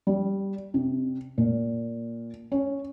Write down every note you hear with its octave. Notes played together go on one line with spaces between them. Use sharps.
G3
C3
A#2
C#4